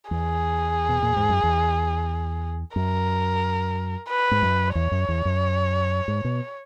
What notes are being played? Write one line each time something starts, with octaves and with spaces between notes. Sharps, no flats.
E2 G#4
B2
A#2
G#2
F#2
E2
F#2 A#4
B4
G#2
F#2
E2 C#5
F#2
E2
F#2
G#2
B2